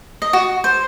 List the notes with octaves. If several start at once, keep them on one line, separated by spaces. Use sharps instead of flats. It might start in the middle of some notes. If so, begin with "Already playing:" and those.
D#5
F#4
C5